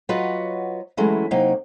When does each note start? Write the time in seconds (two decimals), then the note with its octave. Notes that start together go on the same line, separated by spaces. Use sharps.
0.09 F#3 F4 F#4 B4 C#5 D#5
0.97 E3 F#3 G#3 A3 C#4 E4
1.31 C3 F#3 A#3 D#4